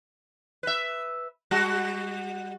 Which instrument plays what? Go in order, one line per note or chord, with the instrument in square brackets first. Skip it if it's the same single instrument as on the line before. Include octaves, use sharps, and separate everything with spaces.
[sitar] B4 E5
G3 F#4